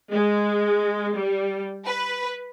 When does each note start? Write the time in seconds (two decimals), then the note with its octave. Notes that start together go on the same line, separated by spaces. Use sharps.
0.12 G#3
1.15 G3
1.86 B4